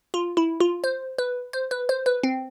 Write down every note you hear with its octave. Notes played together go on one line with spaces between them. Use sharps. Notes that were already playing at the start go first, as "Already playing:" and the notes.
F4
E4
F4
C5
B4
C5
B4
C5
B4
C4